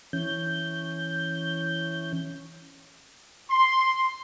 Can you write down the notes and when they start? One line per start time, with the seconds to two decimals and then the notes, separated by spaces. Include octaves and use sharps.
0.13 E3 C#4 G6
3.51 C6